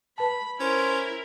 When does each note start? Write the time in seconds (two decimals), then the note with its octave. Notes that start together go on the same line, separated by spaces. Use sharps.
0.18 B4 A5 B5
0.60 C#4 E4 A#4 C5